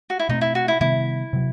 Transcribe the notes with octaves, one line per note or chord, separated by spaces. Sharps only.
F#4
E4
B2 A3 C4 D#4
E4
F#4
E4
C3 D#3 G3 B3 E4
C3 F#3